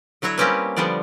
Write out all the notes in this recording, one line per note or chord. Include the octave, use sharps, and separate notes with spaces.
D3 F#3 E4 F#4 C#5
G3 A#3 C4 C#4 G4 B4
D3 F3 G3 B3 D5